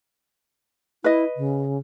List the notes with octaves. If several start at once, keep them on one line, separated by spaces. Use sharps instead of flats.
E4 B4 D#5
C#3